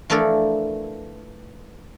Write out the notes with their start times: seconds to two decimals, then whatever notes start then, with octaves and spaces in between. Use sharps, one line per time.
0.10 E3 F3 A3 D4 A4 A#4